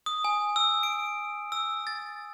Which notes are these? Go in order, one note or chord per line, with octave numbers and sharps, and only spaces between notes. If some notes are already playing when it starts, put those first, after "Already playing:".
D#6
G#5
E6
D7
E6
A6